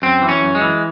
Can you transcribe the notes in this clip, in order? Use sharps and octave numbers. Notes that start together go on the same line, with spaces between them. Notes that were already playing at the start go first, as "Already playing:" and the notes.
F#2 C4
E3
C#4
F#2
G#3
E3